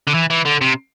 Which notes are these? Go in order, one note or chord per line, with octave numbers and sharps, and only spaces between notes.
D3
E3
E3
D3
C3